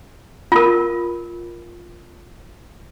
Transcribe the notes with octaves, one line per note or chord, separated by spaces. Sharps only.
F4 A#4